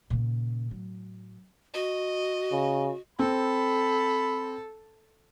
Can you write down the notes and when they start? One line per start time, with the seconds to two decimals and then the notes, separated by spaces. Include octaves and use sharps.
0.10 A#2 C#3
0.70 A2 F#3
1.74 F#4 D#5
2.52 C#3
3.19 C4 A4 B5